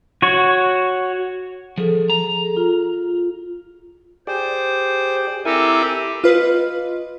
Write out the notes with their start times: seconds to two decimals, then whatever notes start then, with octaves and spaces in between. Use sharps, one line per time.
0.22 F#4 C#5
1.78 F3 G#4 A4
2.10 A#5
2.57 F4
4.27 G4 G#4 C5 D5
5.45 C4 E4 G4 A4 A#4 G#5
6.24 F4 B4 D#5